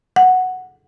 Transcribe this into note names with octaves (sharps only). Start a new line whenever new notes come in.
F#5